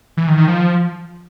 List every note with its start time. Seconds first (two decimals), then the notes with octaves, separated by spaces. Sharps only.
0.17 E3
0.27 D#3
0.37 D#3
0.48 F3